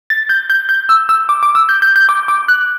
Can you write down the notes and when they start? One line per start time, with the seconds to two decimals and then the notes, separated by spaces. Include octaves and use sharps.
0.10 A6
0.29 G6
0.50 G6
0.69 G6
0.89 E6
1.09 E6
1.29 D6
1.43 D6
1.55 E6
1.69 G6
1.82 G6
1.96 G6
2.09 D6
2.28 D6
2.48 F#6